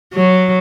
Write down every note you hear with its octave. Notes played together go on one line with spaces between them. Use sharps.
F#3